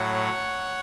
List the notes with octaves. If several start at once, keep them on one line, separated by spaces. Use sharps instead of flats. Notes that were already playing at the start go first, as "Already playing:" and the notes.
Already playing: A2 F#3 C#5 F#5